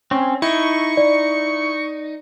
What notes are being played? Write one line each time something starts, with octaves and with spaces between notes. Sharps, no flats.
C4 C#4
D#4 E4 C#6
D5